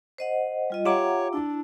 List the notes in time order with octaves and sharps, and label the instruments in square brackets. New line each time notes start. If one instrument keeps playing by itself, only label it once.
[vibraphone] C5 D#5 F#5
G3 F4 D#5
[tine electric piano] F4 G4 D6 [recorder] C#5 [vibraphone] E5 F#5 A#5
[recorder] D4 [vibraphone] E4